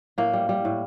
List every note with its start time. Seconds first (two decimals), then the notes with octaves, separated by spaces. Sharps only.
0.18 A2 A#3
0.33 G3
0.49 G3
0.65 A2